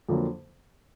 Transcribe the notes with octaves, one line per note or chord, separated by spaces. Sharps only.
F2 D3 F#3 A#3